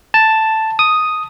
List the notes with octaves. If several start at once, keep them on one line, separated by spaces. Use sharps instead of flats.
A5
D#6